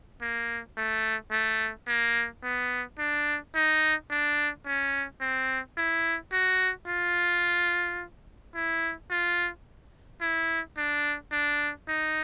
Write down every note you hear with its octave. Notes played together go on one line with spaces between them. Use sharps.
A#3
A3
A3
A#3
B3
D4
D#4
D4
C#4
C4
E4
F#4
F4
E4
F4
E4
D4
D4
D#4